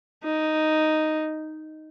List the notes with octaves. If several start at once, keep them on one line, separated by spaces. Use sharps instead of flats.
D#4